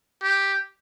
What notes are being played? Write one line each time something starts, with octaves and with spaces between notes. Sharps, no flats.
G4